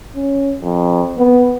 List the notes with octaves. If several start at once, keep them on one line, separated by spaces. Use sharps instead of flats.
C#4
F2
B3